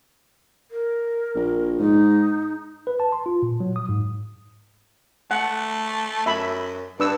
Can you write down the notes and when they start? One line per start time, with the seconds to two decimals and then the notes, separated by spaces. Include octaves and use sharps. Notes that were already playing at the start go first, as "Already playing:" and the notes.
0.71 A#4
1.35 A#1
1.80 G#2 D#4
2.87 B4
3.00 A5
3.12 C6
3.26 F4
3.42 A#2
3.60 F#3
3.76 D#6
3.89 G#2
5.31 A3 F#5
6.26 F#2 E5 B5
7.00 G2 D4 B4 E6